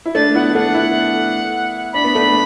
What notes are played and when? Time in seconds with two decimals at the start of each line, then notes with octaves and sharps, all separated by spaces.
0.06 E4
0.15 A3 D4 A6
0.35 B3 E4 F#5
0.55 A3 D4 F#5
0.74 B3 E4
1.93 D4 B5
2.04 B3
2.14 A3 D4